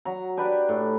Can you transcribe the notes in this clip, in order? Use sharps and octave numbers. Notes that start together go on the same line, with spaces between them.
F#3 A#5
D4 G4 B4 D5
A2